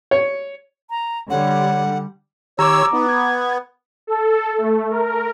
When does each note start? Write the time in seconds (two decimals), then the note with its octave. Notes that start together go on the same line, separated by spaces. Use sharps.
0.11 C#5
0.90 A#5
1.30 D3 G3 C#5 F#5
2.59 D#3 G4 C#5 A#5 D6 E6
2.93 B3 D#4
3.09 G#6
4.07 A4
4.58 A3
4.90 A#4